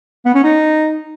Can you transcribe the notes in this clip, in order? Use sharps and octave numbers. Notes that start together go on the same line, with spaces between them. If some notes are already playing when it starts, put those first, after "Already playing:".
B3
C#4
D#4